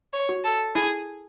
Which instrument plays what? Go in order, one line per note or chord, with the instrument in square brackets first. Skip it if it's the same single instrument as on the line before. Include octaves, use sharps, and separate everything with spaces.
[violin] C#5
[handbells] F#4
[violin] A4
[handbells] E4 [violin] G#4